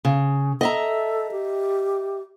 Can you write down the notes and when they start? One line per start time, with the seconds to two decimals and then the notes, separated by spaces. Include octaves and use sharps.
0.05 C#3
0.61 A4 D#5 E5 A#5
1.32 G4